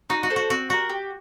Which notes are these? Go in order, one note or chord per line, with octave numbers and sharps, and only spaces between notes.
D#4 F#4
F#4
A4 C5
F#4
C4 F#4
F#4 G4 A#4
G4